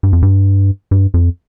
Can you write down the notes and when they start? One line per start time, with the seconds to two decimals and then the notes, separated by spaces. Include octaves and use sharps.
0.03 G2
0.13 F2
0.22 G2
0.91 G2
1.14 F2